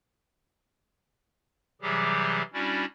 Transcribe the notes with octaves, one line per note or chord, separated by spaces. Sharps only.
C3 E3 F#3 G3 G4 G#4
G3 C#4 D4 E4 F#4 D5